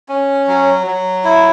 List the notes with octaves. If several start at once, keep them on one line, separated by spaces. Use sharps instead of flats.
C#4
F#3
F#3
E4